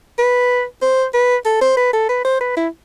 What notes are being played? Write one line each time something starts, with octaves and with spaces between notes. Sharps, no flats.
B4
C5
B4
A4
C5
B4
A4
B4
C5
B4
E4